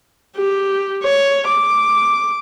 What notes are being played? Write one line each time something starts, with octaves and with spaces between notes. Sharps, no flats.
G4
C#5
D6